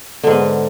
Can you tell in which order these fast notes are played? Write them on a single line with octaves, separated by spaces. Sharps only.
D3 G#2 B3